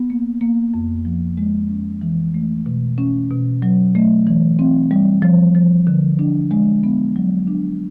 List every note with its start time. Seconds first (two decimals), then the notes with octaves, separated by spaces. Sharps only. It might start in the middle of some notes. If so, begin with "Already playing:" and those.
Already playing: B3
0.10 A#3
0.41 A#3
0.74 F2
1.05 F3
1.37 G#3
1.69 C#4
2.01 E3
2.34 A3
2.66 B2
2.98 C#4
3.31 B2
3.62 F#3
3.95 A3
4.27 E3
4.59 C4
4.91 G3
5.22 F3
5.55 F3
5.87 D3
6.19 D4
6.51 G#3
6.84 B3
7.16 F#3
7.47 D4